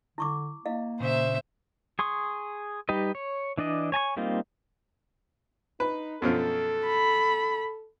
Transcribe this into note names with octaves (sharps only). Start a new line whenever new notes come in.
D3 E4 C#6 D6
A#3 E4 D#5 F5
A#2 C#3 C5 E5
G#4 C6 C#6 D#6
G3 D#4 G4 B4 D#5
C#5
E3 D4 D5 D#5
C#5 G#5 A5 C#6
G3 A#3 C4 D#4 F4
D#4 B4
F#2 B2 F3 A4
B5